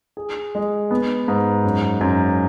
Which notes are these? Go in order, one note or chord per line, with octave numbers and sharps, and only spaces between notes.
G#4
G#3
B3
G#2
F#2
F#2